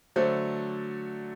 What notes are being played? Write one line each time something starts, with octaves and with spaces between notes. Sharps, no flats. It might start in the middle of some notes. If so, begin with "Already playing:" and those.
D3 F#3 A3 C5